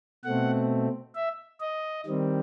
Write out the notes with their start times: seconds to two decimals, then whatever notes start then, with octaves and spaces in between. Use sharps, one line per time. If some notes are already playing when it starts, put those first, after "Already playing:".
0.24 B2 A3 C4 F#5
1.15 E5
1.61 D#5
2.06 D#3 G3 C4